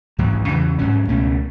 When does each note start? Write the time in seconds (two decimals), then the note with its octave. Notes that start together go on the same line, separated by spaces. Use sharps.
0.19 A1 G#2 F#3
0.48 E2 C#3 E3
0.79 G#2 F#3 C#4
1.09 C#2 B2 A3 C#4